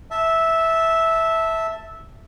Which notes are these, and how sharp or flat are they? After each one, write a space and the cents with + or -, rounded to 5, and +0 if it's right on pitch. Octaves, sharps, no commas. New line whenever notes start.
E5 -10 A5 +0